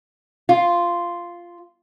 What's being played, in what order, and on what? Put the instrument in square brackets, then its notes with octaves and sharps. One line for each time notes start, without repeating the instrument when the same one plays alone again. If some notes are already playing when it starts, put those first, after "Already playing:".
[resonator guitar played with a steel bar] F4